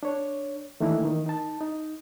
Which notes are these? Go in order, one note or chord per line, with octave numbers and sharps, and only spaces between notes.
D4 C#5
D#3 E3 A3 A#3 D4 E4
D#3
D#4 A5
D#4